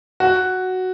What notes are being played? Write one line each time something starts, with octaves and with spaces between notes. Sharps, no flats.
F#4